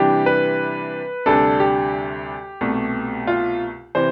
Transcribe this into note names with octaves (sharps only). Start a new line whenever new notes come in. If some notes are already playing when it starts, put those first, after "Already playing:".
Already playing: C3 E3 G3 D4 G4
B4
D2 C3 G3 D4 A4
G4
C2 B2 A3
F4
C3 E3 C5